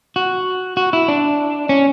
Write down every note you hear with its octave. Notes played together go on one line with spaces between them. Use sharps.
F#4
F#4
E4
D4
C#4